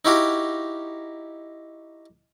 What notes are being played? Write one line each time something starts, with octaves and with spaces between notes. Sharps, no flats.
D#4 E4 F#4 G4 F5